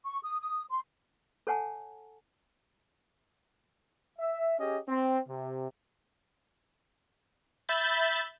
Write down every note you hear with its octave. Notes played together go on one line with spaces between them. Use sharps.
C#6
D#6
D#6
C6
A4 C#5 F#5 G#5 A5
E5
C#4 G4 G#4 D#5
C4
C3
E5 B5 G6 A6